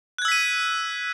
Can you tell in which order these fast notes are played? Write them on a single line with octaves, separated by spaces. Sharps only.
F#6 G#6 E6 B6 D#7